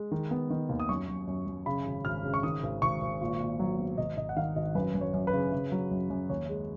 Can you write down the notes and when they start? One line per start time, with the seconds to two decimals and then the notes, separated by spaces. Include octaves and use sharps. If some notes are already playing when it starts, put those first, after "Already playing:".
Already playing: G#3
0.12 D#3
0.31 B3
0.50 D#3
0.69 D#2
0.80 D#6
0.89 F#2 C#6
1.08 F#2
1.27 F#2
1.47 F#2
1.66 C#3 B5
1.86 G#1
2.05 G#1 F6
2.24 C#3
2.34 C#6
2.43 D#3 D#6
2.63 G#1
2.82 G#1 C#6
3.01 G#1
3.21 A#2
3.40 A#2
3.60 F#3
3.79 B3
3.98 G#1 D#5
4.17 G#1 D#5
4.29 F#5
4.37 D#3 F5
4.56 G#1 D#5
4.75 F#2 B4
4.95 F#2
5.01 C#5
5.14 F#2
5.27 B4
5.33 C#3
5.52 C#3
5.72 F#3
5.91 F#2
6.10 F#2
6.29 D#2 C#5
6.49 G#3